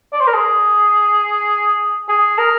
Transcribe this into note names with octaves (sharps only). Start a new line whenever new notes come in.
D5
C5
A#4
G#4
G#4
A#4